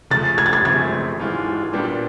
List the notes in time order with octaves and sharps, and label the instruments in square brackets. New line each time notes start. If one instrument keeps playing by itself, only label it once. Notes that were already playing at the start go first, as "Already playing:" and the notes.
[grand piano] C#3 F3 A3 [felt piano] A6
[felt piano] G#6
A6
G#6
[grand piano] F#2 C#3 F3 A3 C4 [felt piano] G#6
[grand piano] G#2 E3 G#3 C#4 F4
A#2 G3 B3 D4 G4